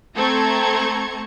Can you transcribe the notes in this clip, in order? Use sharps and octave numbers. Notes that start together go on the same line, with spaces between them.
A3 C4 A4 A#5 C#6 G#6